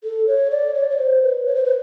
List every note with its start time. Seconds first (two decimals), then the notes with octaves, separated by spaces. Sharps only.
0.04 A4
0.27 C#5
0.51 D5
0.75 C#5
0.90 C#5
0.98 C5
1.22 B4
1.46 C#5
1.55 C5
1.65 B4